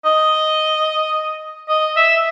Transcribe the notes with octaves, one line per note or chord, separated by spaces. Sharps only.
D#5
D#5
E5